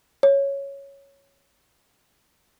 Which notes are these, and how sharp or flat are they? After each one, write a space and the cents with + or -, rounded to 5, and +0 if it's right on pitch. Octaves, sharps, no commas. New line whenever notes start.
C#5 +0